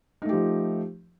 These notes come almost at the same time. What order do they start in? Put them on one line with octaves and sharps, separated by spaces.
D#4 A3 G4 F3